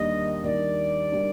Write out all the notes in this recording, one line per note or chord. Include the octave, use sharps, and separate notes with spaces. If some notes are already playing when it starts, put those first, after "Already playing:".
Already playing: D#2 D#3 G3 A#3 D4 D#5
D#2 D#3 G3 A#3 D4 D5
D#3 G3 A#3 D4